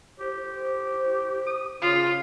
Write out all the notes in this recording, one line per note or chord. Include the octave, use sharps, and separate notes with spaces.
G4 C5
D#6
C#3 F4 D#6